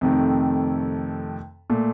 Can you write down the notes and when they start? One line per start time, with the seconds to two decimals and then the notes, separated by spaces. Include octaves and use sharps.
0.01 F2 C3 D#3 A3
1.70 A#2 A3